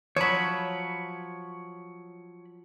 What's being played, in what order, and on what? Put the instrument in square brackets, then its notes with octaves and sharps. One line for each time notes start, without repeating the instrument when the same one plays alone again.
[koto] F3 F#3 [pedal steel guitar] C#5 B5